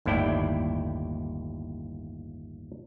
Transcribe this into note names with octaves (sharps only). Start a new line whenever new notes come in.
G1 D#2 A2 E4 D5 G5